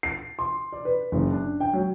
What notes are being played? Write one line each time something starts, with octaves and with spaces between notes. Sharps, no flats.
C7
C6
D5
B4
F#1
D4
G5
F#3